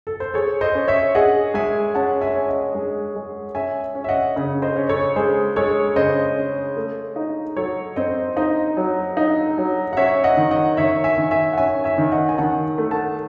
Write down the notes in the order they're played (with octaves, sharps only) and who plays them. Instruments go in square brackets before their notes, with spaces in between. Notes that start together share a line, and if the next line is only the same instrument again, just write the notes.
[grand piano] A4
C5
[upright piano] G#4 [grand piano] A4 C#5
[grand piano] C5 D#5
[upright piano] C#4
[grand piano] C#5 E5
[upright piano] G#4 [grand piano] D#5 F#5
[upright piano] G#3 [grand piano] E5 G#5
[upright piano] C#4 [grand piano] F#5 A5
[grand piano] E5 G#5
[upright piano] C#4
[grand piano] D#5 F#5
[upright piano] G#3
G#3
[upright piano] C#4 [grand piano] E5 G#5
[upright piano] C#4
[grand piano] E5
D#5 F#5
[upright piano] C#3
[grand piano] C5 D#5
[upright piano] C#4
[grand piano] A4 C#5
[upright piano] G#3 [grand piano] G#4 C5
[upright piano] G#3 [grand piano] A4 C#5
[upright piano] C#3 [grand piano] C5 D#5
[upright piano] C#4
A3
D#4
[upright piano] F#3 [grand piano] A4 C#5
[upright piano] C4 [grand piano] C5 D#5
[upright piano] D#4 [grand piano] C5 D#5
[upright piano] F#3
D#4
F#3
[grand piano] F#5
[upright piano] C#4 [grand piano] C#5 E5
[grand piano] D#5 F#5
[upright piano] D#3
[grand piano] D#5 F#5
[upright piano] D#3 [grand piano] C#5 E5
[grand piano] E5 G#5
[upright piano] D#3
[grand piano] E5 G#5
F#5
[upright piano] C#4 [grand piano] E5 G#5
[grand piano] E5 G#5
[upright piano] D#3
[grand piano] D#5 F#5
G#5
[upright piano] D#3 [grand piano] F#5 A5
[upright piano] A3
[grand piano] F#5 A5